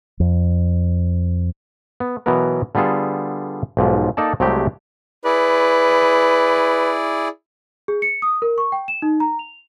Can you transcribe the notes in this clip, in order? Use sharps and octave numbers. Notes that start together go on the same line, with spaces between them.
F2
B3
B2 E3 F#3 B3 A#4
D3 G3 B3 F4 G#4 A4
B1 G#2 F3
A#3 D#4 A4 D5 A5
C2 F#3 G#3 A3 C4 G4
E4 G#4 B4 D5
G#4
C#7
D#6
A#4
C#6
G5
E7
D#4
A#5
F7